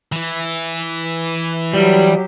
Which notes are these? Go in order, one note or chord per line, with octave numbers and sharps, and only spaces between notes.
E3 E4
F#3 G3 G4